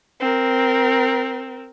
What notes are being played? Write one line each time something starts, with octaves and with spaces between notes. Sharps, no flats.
C4 A#4